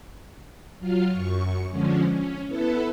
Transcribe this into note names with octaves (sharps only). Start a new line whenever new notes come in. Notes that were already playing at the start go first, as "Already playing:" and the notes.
F#3 F4 F6
F#2 C#6
D3 F3 G#3 C#4
C#4
B3 E4 A4 B4